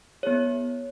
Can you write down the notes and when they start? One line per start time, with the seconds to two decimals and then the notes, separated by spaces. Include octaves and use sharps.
0.23 B3 E4 G#4 C#5